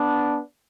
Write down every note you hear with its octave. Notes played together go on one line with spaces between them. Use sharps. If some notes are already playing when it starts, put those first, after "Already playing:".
Already playing: B3 D4